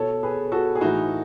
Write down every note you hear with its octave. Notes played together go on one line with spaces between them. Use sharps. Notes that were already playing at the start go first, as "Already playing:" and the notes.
Already playing: B2 A4 C#5
G#4 B4
F#4 A4
G#4
A2 E3 D#4 F#4